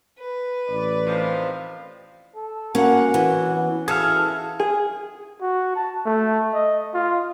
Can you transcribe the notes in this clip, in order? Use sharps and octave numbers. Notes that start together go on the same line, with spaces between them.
B4
A1 D5
C3 D#3 F3
A4
A#3 C#4 F#4 F#5
E3
B3
E3 E4 F#4 G#4 A4 F5
G#4
F#4
A5
A3
D#5
F4